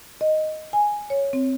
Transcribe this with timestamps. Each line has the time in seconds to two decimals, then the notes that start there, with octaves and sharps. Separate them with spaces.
0.21 D#5
0.73 G#5
1.10 C#5
1.33 C4